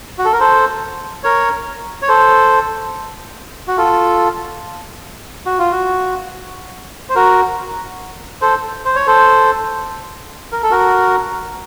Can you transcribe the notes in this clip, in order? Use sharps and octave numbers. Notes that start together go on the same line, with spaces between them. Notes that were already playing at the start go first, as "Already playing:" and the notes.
F#4
A4
A#4
A4 C5
A#4 C#5
C#5
A4 C5
F#4
F4 A4
F#4
F4
F#4
C5
F#4 A#4
A4 C5
C5
C#5
A4 C5
A#4
A4
F#4 A#4